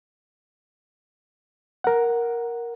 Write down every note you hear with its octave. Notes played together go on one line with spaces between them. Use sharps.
A#4 F#5